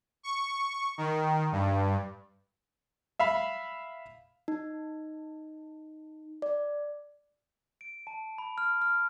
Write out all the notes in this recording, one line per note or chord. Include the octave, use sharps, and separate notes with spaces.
C#6
D#3
G2
E5 F5 B5
D#4
D5
D7
A5
B5
F6
F6